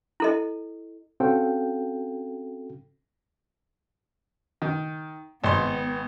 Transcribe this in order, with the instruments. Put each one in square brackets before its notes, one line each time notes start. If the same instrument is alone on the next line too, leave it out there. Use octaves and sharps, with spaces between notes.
[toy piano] E4 A4 D#5
[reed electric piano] C4 C#4 F#4 A4 F5 G5
[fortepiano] D#3
[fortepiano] G#1 C6 [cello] B3